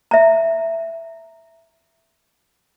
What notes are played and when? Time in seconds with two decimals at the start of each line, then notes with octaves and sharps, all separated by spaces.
0.11 E5 A#5